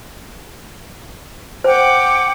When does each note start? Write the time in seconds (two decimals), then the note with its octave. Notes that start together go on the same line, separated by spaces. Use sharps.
1.64 C5 F#5 G5 D6